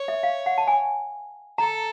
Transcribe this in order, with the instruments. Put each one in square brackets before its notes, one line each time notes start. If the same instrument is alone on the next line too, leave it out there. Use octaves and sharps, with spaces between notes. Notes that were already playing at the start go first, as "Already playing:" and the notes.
Already playing: [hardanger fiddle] C#5
[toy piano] E5
F5
F#5
A5
G#5
[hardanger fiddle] A4 [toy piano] A#5